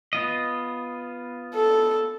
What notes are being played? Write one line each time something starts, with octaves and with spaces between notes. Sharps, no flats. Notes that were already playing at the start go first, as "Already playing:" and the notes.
B3 F4 D#5
A4